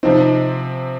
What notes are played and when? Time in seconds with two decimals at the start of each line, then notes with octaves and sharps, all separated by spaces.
0.03 C3 F3 C4 D#4